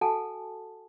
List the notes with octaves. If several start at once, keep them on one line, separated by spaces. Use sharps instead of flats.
F#4 A4 F#5 G#5 A5